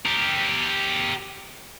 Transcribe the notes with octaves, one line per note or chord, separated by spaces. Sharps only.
G4 A#4